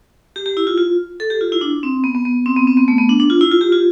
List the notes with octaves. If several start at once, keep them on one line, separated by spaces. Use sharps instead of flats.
G4
G4
E4
F4
F4
A4
G4
F4
E4
D4
C4
B3
B3
B3
C4
B3
C4
B3
A3
B3
D4
D4
F4
E4
F4
G4
F4